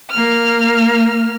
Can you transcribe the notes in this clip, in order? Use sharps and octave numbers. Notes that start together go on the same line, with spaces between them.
A#3 F6